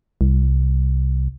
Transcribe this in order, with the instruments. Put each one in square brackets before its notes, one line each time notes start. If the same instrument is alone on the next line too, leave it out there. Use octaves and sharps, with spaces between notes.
[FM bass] C2